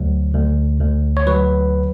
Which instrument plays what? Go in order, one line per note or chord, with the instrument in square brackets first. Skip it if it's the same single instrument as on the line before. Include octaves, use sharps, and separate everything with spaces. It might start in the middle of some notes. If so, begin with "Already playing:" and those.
Already playing: [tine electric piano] D2 F#3
D2
D2
C#5
F#3 B4